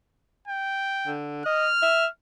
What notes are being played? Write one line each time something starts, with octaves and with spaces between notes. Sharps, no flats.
G5
D3
D#5 F6
E5